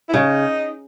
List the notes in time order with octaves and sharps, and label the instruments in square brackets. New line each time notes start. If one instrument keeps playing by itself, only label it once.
[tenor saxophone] E4
[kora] C#3 [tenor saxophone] D#4